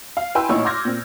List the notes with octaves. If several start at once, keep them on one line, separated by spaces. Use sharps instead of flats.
F5
E4 B4 G5 G#5 C6 E6
A1 A#2 D#4 E4 C#6
C6 D6 F6 G6 G#6 A#6
A#2 C4